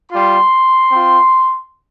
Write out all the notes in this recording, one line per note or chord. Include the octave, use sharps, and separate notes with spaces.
G3 F4 C6
C4 F4